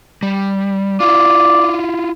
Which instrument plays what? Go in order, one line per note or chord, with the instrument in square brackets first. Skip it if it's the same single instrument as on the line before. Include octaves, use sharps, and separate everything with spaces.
[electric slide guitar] G3
[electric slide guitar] E4 F4 [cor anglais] D5